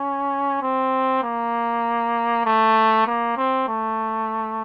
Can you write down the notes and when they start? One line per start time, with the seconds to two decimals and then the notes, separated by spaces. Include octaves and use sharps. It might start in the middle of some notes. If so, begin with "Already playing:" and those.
Already playing: C#4
0.61 C4
1.23 A#3
2.45 A3
3.07 A#3
3.37 C4
3.68 A3